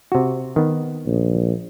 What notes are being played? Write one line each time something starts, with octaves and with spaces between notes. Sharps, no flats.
C3 F#4
D#3 B3
A#1